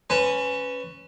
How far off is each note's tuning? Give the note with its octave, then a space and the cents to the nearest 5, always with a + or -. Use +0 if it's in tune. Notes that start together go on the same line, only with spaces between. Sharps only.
C#4 +0 B4 +15 A5 +35